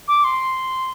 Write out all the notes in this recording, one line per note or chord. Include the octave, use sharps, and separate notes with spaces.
D6
C6